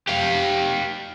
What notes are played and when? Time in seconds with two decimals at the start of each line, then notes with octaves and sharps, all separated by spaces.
0.07 G4 F5